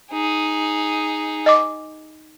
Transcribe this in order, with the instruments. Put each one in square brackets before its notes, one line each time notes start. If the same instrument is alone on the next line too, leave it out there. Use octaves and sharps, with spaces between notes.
[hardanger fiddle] D#4 G#4
[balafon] D#5 D6